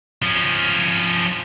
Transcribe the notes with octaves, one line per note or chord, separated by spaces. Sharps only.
F3 C#4